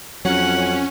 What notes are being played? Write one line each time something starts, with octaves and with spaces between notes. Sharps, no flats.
F2 F#3 C#4 F#5